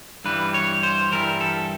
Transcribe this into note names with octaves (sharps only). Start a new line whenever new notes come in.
G2 E3 G3 B4
C#5
C5
G2 E3 G3 A#4
A4